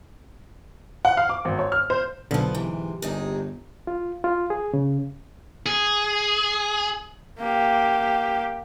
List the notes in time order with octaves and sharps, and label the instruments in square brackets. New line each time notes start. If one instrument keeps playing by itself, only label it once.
[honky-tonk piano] F#5
F5
D6
G#1
C#5
F6
C5
[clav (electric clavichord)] B1 D3 [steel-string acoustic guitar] F3 B3
[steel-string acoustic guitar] G#2 C3 [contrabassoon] E3
[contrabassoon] G1 [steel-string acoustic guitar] C3 D#4 G#4
[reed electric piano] F4
F4
G#4
C#3
[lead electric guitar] G#4
[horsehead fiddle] A#3 G4